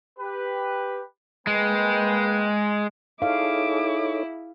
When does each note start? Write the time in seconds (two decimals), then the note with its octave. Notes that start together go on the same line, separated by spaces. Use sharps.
0.19 G4 B4
1.47 G#3 A#3 B4 G5
3.22 D#4 E4 G#4 A4 C#5 F5 D6